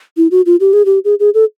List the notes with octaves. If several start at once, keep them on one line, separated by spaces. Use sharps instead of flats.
E4
F#4
F4
G4
G#4
G4
G#4
G#4
A4